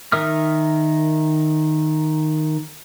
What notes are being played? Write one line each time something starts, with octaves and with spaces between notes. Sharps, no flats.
D#3 A#4 E5 D#6 F6